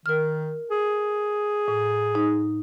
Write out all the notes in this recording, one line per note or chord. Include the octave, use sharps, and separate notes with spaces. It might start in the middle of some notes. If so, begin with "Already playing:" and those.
D#3 A#4 F6
G#4
A2
D#4